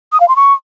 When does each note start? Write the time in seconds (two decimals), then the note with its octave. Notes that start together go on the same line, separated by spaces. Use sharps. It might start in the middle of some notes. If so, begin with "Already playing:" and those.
0.12 D#6
0.20 F5
0.28 C6
0.36 C#6